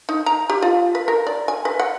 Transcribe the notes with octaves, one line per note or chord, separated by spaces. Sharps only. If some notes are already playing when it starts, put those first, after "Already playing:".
D#4
A#5
G4
F4
B4
A#4
D5
G#5
B4
F#5